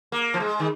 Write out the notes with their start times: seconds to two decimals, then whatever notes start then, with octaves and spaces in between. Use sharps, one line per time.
0.12 A#3
0.34 F3
0.40 G#3
0.60 D#3